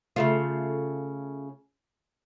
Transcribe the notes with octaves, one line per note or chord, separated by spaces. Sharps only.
C#3 A3 F4